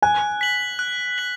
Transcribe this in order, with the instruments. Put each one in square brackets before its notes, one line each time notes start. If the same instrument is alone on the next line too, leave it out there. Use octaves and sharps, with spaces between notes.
[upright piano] G#5 [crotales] F#6
[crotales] B6 F#7
F#6
B6 F#7